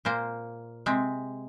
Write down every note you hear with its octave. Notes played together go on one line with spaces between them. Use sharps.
A#2 A#3 C5
C3 G#3 C4